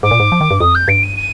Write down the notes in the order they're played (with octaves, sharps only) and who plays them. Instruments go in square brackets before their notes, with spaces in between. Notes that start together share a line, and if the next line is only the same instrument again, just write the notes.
[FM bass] G#2 [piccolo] D6
[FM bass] A#2
G#2
F3
D#3
G2
[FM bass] F2 [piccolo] D#6
[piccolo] G6
[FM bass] G2 [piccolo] D7
[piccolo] D#7
D#7